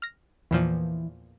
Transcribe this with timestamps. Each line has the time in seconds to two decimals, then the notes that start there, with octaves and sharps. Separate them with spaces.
0.02 F6 A#6
0.51 E2 A#2 E3 F3